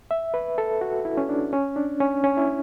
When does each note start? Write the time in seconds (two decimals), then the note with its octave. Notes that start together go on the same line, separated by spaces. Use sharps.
0.11 E5
0.34 B4
0.58 A4
0.81 F#4
1.05 E4
1.17 C#4
1.29 D4
1.53 C#4
1.76 D4
2.00 C#4
2.24 C#4
2.37 E4